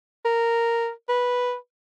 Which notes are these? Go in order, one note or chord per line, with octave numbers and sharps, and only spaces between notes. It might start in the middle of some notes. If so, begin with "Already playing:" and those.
A#4
B4